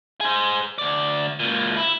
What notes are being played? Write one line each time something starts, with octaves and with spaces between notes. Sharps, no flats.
G#4 C5
D2 D5
C#2 A#2
E4